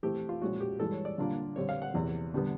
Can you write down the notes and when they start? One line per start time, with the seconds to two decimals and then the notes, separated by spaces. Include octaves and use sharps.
0.03 E3 A3 C4 E4 G4
0.29 F4
0.41 A#2 F3 G#3 C#4 E4 F#4
0.60 G4
0.79 G2 E3 G#3 A4
0.92 C#5
1.05 D5
1.18 D3 G3 A#3 D4 F4
1.56 D3 G3 C4 C#5
1.69 F5
1.82 F#5
1.94 E2 C3 E3
2.34 D3 G3 B3